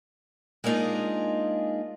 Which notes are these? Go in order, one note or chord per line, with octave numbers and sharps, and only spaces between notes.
G#3 A#3 D4 D#4 F4 G#4